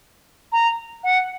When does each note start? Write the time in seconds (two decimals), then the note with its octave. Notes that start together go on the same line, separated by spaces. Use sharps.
0.52 A#5
1.03 F#5